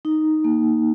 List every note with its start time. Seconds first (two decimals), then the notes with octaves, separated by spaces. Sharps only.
0.05 D#4
0.44 A#3